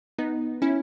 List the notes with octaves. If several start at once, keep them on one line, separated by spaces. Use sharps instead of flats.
B3 D#4
C#4 E4